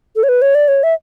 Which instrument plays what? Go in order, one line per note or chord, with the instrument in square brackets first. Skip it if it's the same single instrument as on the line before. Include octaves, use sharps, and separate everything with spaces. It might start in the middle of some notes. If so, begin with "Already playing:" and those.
[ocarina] A4
C#5
B4
C#5
D5
C#5
E5